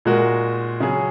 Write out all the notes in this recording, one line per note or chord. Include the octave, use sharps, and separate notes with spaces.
A#2 G#3 F#4 A#4
C#3 F#3 C#4 G#4